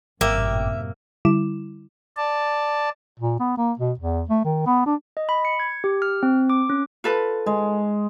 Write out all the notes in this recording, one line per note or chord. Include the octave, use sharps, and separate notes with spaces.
G#1 F#2 A2 C3 A#3 E5 G5 D6
D3 G3 E4 D6 E7
D5 A5
A#2
B3
A#3
B2
E2
A3
D#3
B3
D4
D#5
B5
C#7
G#6
G4
F6
C4
D6
C#4
F4 A4 B4
G#3